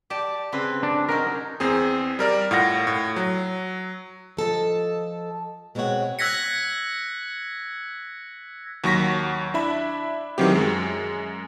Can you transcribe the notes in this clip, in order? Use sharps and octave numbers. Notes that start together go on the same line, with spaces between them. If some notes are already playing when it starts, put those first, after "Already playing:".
G4 D5 A5
C#3 C4 B4
D4
F#3 C#4 D#4 A#4
E2 C4 G#4
G3 A#4 D5
A2 F4 F#5 A#6
A2
F#3
F3 A4 D#5 A5
B2 G#3 C4 A#4 C#5 F#5
E6 F#6 G#6 A#6 B6 C#7
D#2 F#3 C#6 A#6 B6
D4 E4 E5 B5
D#3 E3 F#3 C4 G4
F#2 G#3